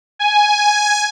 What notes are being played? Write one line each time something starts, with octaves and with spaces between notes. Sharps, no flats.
G#5